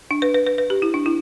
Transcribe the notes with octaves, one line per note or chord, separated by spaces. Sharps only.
D4
B4
B4
B4
B4
G4
E4
D4
E4